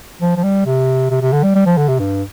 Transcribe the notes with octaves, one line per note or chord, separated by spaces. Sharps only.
F3
F3
G3
C3
C3
C3
D3
G3
G3
F3
D3
C3
G2